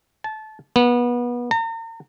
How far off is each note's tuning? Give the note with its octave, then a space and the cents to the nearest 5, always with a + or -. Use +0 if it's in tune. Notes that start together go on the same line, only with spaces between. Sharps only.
A5 -20
B3 -25
A#5 -40